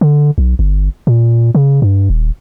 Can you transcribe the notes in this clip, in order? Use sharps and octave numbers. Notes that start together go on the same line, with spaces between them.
D3
B1
G1
A#2
C#3
G2
D#1